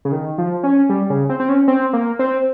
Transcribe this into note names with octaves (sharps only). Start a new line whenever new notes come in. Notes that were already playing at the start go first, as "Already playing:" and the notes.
C#3
D#3
F3
C#4
G3
C#3
C4
C4
C#4
C4
A#3
C4